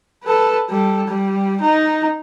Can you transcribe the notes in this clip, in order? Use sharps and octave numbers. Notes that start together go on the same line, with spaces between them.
A4 B4
G3 A4
G3
D#4